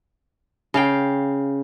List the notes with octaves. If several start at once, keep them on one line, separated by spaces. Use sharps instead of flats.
C#3 F5 G5